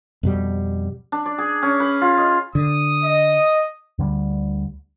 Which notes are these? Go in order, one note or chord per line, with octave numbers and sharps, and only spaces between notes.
F2 B2 G3
D4
D5
G#4
C#4
B4
F4
D#5
D3 D#6
D#5
D2 D3 E3 G3